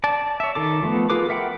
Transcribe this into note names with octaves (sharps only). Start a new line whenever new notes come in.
D5 A5
C#5 E5
D#3 A4 D6
F3 A3 B3
F4 G#4 A#4 B4 D6
A#4 E5 F#5 G5 B5